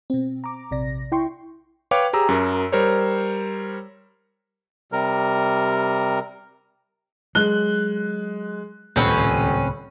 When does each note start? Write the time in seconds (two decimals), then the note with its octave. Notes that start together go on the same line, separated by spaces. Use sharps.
0.10 B2 C4
0.44 A#5 D6
0.71 A#1 C3 D5 A#6
1.12 E4 G5 C6 C#6
1.91 B4 C#5 F5 G5 D6
2.13 G4 G#4 A#5 E6
2.29 F#2 F#3 A#4
2.72 G3 A#4 C5 C#5
4.92 C3 G3 A#4
7.35 F#3 G#3 F#6 G7
8.96 D#1 C#2 A2 C#3 C4 C#4 B4